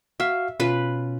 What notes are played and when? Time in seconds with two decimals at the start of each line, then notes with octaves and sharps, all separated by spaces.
0.20 F#4 E5 F5
0.60 B2 C#4 F4 B4